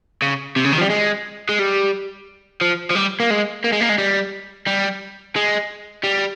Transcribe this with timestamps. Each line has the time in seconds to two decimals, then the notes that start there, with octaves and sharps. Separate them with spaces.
0.22 C#3
0.56 C3
0.65 C#3
0.72 D#3
0.78 F3
0.81 G3
0.90 G#3
1.49 G#3
1.59 G3
2.61 F3
2.90 F3
2.95 G3
3.20 A#3
3.30 G#3
3.64 A#3
3.73 G#3
3.81 A#3
3.89 G#3
3.98 G3
4.67 G3
5.36 G#3
6.04 G3